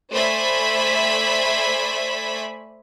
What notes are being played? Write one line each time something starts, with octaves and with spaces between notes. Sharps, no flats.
A3 C5 D5 E5 G#5 B5